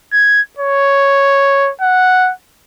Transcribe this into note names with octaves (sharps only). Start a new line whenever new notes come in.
G#6
C#5
F#5